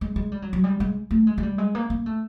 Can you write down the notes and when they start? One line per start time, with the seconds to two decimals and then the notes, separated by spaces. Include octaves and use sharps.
0.01 G#3
0.16 G#3
0.32 G3
0.42 F#3
0.53 F#3
0.64 G3
0.80 G#3
1.11 A3
1.27 G#3
1.38 G#3
1.43 G3
1.58 G#3
1.75 A#3
1.90 A#3
2.06 A3